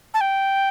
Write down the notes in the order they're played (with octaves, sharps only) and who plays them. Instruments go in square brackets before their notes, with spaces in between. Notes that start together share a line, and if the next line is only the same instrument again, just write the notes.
[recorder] A5
G5